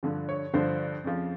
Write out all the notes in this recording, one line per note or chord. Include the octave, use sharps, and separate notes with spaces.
G2 D3 F3
C#5
G2 D3 F3 C5
F2 C#3 F3